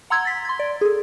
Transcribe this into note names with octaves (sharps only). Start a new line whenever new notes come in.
F#5 A#5 C6 E6 G#6
A6 B6
C6 G#6
D5
G#4 A4